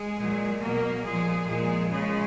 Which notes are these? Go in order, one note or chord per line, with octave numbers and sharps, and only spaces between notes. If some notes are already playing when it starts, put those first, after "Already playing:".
Already playing: G#3 G#4
A#2 F#3
B2 F#3 A#3 A#4
A#2 F3 G#3 G#4
A#2 F3 G#3 G#4
C#3 F3 G#3 G#4